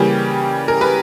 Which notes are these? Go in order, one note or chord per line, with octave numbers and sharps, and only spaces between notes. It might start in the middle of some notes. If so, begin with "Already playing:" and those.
Already playing: C#3 E3 G3 A#3 C#4 G4
A#4
B4